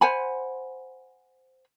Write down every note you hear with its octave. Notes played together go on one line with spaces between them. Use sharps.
C5 F#5 G#5 B5